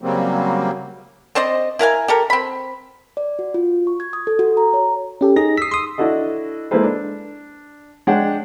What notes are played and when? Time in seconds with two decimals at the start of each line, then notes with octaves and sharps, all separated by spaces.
0.02 C#3 F#3 G3 A#3 C4
1.35 C4 C5 D5 D#5
1.79 E4 A#4 F5 G#5
2.08 G4 A4 A#4
2.30 C4 B5
3.17 D5
3.39 F#4
3.54 F4
3.87 C#6
4.00 G#6
4.13 D#6
4.27 A4
4.39 F#4
4.57 A#5
4.74 C#5
5.21 C#4 G4 A4
5.36 D#4 G#4 A#6
5.58 D#6 E6 B6 C7
5.71 C6 D#6
5.98 D4 E4 F#4 A4 D#5
6.71 G#3 A#3 E4 A4 B4 C5
6.84 D4
8.07 G#3 D4 C#5 D5 F#5 G5